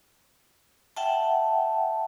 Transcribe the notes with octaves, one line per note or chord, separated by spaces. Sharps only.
E5 F#5 G5 A5